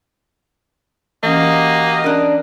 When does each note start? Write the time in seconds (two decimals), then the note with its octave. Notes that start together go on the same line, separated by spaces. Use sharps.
1.23 E3 A#3 C#4 F#4 G4 D#5
2.04 C#4 D4 A#4 F#6